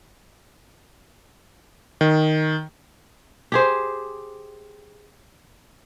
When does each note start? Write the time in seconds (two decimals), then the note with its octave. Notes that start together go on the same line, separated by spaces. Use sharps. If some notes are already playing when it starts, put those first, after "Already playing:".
2.01 D#3
3.52 G4 G#4 C5